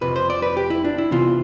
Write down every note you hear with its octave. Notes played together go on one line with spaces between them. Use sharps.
F2 C3 F3 B4
C5
D5
B4
G4
E4
D4
E4
C3 E3 B3 F4